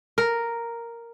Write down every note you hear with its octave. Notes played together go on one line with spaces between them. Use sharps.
A#4